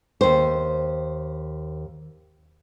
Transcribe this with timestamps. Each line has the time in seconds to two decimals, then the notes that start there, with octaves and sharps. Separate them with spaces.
0.21 D#2 C5